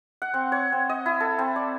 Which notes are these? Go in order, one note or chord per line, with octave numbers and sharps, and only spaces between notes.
F#5
C4
C#5
C4
D#5
E4
A4
C4
D5